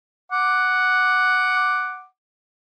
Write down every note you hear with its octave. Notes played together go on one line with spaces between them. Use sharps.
F#5 D6